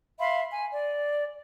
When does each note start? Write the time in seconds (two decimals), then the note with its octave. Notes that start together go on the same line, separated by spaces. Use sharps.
0.19 E5 F5 B5 C6
0.51 G#5
0.72 D5